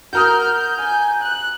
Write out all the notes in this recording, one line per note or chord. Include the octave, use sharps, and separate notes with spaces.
F#4 A#4 A#5 D#6 F6 G6
G#5
F#6